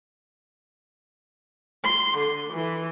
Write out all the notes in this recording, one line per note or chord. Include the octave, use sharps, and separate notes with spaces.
C6
D3
E3